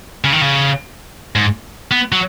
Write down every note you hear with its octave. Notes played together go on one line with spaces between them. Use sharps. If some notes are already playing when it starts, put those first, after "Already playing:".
C#3
D#3
C#3
G#2
B3
F#3